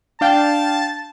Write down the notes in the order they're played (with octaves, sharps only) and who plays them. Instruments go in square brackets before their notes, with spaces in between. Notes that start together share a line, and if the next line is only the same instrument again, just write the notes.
[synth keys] D4 F5 G5 [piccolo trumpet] A5